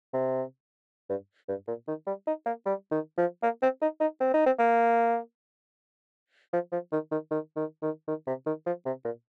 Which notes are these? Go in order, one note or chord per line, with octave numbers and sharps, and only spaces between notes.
C3
G2
G2
A#2
D#3
G3
D#4
A#3
G3
D#3
F3
A#3
C4
D#4
D#4
C4
D#4
C4
A#3
F3
F3
D#3
D#3
D#3
D#3
D#3
D#3
C3
D#3
F3
C3
A#2